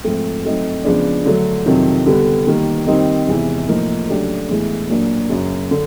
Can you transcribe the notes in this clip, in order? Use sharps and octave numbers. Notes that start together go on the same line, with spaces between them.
G#2 F3 A3 C4
F#3 A3 C4 D#4
C#3 F3 G#3 B3 D4
D3 F#3 A3
F2 C3 D#3 F#3
D3 G3 B3
D#3 G3 A#3
D#3 G3 C4 D#4
E2 C3 E3 G#3
A2 F3 A#3 D#4
C#3 F#3 A3 D4 G4
A2 E3 G#3 B3
A#2 F#3 A#3 D4
F#2 C#3 F#3
D3